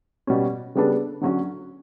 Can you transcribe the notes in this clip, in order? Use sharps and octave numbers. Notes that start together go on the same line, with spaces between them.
B2 G3 C#4
C#3 G3 B3 D4 A4
D3 F#3 C#4 F#4